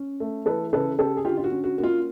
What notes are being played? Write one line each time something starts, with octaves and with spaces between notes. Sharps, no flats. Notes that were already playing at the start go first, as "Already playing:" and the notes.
Already playing: C#4
A3
E3 A4 B4
C#3 A4 B4
C#4 G4 A4
G#4
D3 F4 G4
F4
F#4
C#4
F#4
A#3 F#4
F4